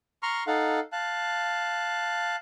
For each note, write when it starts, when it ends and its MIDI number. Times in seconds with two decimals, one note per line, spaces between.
0.23 0.44 82
0.23 0.44 84
0.23 0.44 85
0.23 0.44 89
0.47 0.80 63
0.47 0.80 69
0.47 0.80 77
0.47 0.80 78
0.92 2.36 77
0.92 2.36 81
0.92 2.36 90